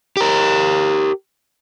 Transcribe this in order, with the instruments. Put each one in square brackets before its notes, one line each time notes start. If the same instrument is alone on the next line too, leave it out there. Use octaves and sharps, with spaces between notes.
[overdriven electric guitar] G4 A#4